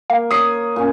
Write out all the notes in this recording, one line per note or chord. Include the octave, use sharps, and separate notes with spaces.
A#3 F5
C#5 D#6 C7
A#2 C#4